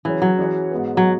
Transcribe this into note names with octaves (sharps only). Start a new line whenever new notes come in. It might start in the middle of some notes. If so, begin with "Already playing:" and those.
C#3 E3 F#3 C#4
F#3
E3 C#4 G#4 C#5
G#2 G#3 B3 F#4 B4
F#3